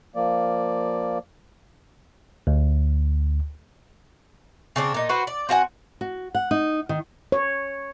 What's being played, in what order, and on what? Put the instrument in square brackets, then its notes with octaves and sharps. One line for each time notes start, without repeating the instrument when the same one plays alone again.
[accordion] F3 A#3 D5
[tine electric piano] D2
[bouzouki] C#3 C4 D4
A#2 D#4
F#4 B4 C5
D5
C4 F#4 F#5 G#5
[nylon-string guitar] F#4
F#5
D#4
D#3
[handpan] C#5